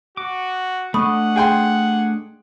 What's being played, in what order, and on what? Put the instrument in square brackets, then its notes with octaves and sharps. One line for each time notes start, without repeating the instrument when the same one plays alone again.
[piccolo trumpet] F#4 [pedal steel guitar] D6
[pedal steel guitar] A3 D4 D#5 [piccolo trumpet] F#5 [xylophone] B5 C#6 D#6
[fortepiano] G#4 G5 C6